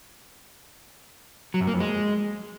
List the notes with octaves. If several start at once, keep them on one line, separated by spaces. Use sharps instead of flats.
F#3
F#2
A#3
F2
G#3